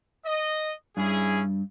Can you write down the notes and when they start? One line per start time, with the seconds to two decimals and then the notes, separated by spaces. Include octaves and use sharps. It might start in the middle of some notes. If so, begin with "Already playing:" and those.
0.25 D#5
0.97 G2 C#4 E4 G#4